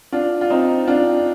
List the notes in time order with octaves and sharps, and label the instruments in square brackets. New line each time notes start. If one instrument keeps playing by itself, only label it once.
[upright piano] D4 F4
F4
C4 D#4
D4 F4